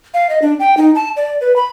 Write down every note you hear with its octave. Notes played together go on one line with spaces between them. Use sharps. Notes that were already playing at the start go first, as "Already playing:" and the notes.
F5
D#5
D4
G5
D#4
A5
D5
B4
B5